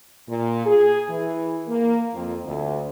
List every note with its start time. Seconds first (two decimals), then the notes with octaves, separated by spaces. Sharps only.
0.27 A#2
0.65 G#4
1.08 E3
1.67 A#3
2.13 F2
2.45 D2